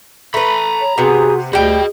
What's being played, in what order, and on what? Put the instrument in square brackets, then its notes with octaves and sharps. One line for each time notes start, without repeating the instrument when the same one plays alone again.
[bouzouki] A3 B4 [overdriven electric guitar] A#5 B5
[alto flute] C#5
[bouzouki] C3 B3 [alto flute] F#4 [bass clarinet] G#4
[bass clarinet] D2 [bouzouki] G3 G5 [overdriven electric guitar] F#4 D#5 [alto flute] G#4